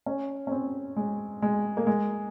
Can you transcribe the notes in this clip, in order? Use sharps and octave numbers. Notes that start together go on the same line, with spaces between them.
C#4
C#4
C4
G#3
G#3
A#3
G#3